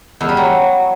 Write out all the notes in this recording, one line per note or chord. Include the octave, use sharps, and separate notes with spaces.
E2
G3
F#3